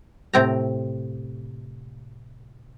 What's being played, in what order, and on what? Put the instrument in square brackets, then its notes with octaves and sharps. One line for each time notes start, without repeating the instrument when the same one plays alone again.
[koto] A2 C3 C4 G5 A#5